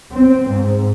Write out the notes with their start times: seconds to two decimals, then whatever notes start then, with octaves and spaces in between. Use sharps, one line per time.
0.12 C4
0.48 G#2